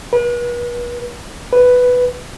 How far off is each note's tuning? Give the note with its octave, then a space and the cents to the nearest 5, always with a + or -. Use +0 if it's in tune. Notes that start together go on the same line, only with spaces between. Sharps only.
B4 -40
B4 +5